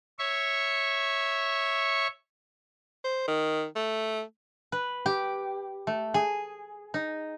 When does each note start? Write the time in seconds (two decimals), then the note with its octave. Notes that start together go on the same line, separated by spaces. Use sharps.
0.19 C#5 E5 C#6
3.04 C5
3.28 D#3
3.76 A3
4.72 B4
5.06 G4
5.87 A3
6.14 G#4
6.94 D#4